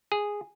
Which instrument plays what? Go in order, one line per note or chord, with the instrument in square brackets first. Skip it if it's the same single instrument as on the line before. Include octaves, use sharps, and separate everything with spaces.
[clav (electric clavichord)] G#4